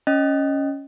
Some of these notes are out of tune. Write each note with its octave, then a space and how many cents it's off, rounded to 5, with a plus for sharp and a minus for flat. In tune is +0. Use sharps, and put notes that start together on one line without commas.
C#4 +0 D#5 +0